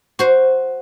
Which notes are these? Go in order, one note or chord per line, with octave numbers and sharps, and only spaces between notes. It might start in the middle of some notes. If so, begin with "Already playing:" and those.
F#4 C5